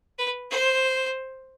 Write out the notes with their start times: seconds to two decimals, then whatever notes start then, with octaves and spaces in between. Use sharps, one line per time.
0.18 B4
0.50 C5